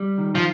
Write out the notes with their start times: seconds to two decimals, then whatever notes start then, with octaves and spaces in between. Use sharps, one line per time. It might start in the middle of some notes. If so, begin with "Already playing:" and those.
Already playing: G3
0.18 D#3
0.35 F3